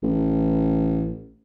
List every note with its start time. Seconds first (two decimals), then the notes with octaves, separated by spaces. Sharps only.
0.03 A1